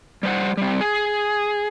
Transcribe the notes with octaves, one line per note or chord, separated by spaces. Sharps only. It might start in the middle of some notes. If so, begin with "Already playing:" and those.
G3 C5 F#5
G3 C4
G#4